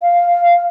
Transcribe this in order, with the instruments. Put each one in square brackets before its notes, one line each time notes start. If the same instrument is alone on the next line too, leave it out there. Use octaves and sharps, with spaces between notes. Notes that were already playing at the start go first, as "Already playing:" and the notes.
[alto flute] F5